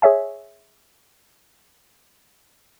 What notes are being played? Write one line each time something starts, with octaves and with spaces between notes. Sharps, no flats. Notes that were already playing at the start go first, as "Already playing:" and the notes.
G#4 C#5 E5 G#5